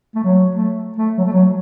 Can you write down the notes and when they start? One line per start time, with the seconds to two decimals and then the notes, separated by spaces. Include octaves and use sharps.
0.15 A3
0.24 F#3
0.55 A3
0.96 A3
1.18 F#3
1.25 A3
1.33 F#3